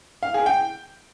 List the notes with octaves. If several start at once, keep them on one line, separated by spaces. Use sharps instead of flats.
F5
G#4
G5